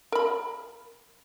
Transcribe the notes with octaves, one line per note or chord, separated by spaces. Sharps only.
A#4 B5